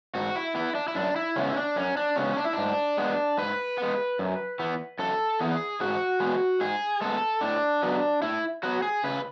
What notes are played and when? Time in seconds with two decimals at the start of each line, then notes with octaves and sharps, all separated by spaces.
0.15 G#2 F#4
0.36 E4
0.55 E3 B3 E4
0.75 D4
0.88 E4
0.95 F#2 D4
1.16 E4
1.36 C#3 G#3 B3 C#4
1.50 E4
1.56 D4
1.76 F#2 C#4
1.97 D4
2.16 C#3 G#3 B3 C#4
2.37 D4
2.45 E4
2.53 G#2 D4
2.97 G#3 B3
3.38 G#2 B4
3.78 G#3 B3
4.19 F#2
4.59 E3 B3
4.99 F#2 A4
5.40 E3 B3 G#4
5.80 G#2 F#4
6.20 G#3 B3
6.60 G#2 G#4
7.01 G#3 B3 A4
7.41 A2 D4
7.83 F#3 B3
8.22 A2 E4
8.63 F#3 B3 F#4
8.83 G#4
9.04 C#3 B4